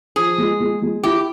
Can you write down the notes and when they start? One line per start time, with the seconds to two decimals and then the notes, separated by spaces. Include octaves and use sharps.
0.16 F3 G#4
0.38 G#3
0.60 G#3
0.82 G#3
1.03 E4 G4